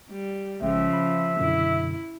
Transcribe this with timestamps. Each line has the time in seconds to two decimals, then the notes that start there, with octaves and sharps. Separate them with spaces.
0.10 G3
0.62 A1 C#3 F3 G#3 E5 G5
0.93 B5
1.40 F#2 B2 D3 E4